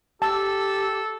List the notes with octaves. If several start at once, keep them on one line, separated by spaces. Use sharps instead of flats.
G4 A4 A5 E6